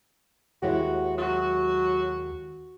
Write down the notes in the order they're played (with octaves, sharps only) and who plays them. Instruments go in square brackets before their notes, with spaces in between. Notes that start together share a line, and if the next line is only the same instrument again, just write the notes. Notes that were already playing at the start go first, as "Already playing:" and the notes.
[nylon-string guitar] D#2 G#3 E4 [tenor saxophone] F#4 [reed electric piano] G4 C#5 F#5
[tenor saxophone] F#3 [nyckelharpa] F#4